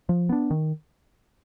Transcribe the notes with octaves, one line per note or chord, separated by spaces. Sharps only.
F3
B3 D4
D#3